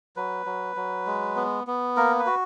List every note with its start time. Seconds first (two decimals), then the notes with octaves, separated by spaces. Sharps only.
0.16 F#3 B4
0.46 F#3
0.76 F#3
1.07 G#3
1.36 B3
1.67 B3
1.97 A#3 A#4
2.19 B4
2.26 F#4